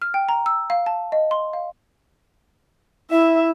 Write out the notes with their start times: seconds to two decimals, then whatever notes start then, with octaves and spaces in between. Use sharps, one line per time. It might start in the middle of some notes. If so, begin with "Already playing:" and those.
0.02 F6
0.14 G5
0.29 A#5
0.46 E6
0.70 F5
0.86 A5
1.12 D#5
1.31 C6
1.53 F5
3.11 E4 E5